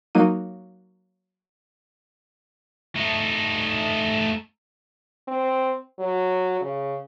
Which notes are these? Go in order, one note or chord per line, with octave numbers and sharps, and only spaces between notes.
F#3 A#3 D#4 D#7
A3 D#4
C4
F#3
C#3